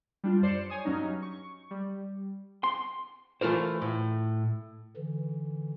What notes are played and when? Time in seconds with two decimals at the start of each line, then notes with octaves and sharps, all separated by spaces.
0.24 G3 D4 F4
0.42 F#2 C5 D5 C7 C#7 E7
0.70 C#5 G#5 D#6
0.85 G2 F#3 C#4 D#4
1.22 C#6
1.71 G3
2.64 C6
3.41 E3 A3 F4 A#4 C5
3.82 A2
4.97 D3 E3